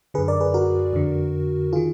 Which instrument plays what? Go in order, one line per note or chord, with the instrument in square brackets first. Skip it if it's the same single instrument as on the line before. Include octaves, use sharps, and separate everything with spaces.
[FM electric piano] F#2 D3 G#4 B4
A#4 D5
G#4 B4
F#4 A#4
F2 D3
D#3 F4 G#4